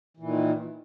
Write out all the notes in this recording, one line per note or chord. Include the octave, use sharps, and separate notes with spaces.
A#2 D#3 E3